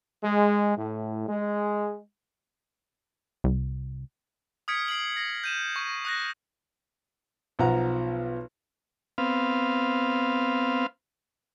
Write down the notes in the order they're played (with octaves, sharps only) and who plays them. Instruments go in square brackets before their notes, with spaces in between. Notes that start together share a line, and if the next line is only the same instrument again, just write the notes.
[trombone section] G#3
A2
G#3
[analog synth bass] C2
[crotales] D#6 F6 G#6 B6 C#7 D7
C7 D7 F#7
A#6 C7
G6 D#7 E7
C#6
D#6 F#6 A#6
[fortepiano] B1 F3 F#5 A#5
[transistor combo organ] B3 C4 F5